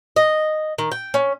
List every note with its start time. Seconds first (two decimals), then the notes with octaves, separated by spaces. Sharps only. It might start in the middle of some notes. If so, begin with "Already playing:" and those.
0.16 D#5
0.78 D#3
0.92 G5
1.14 C#4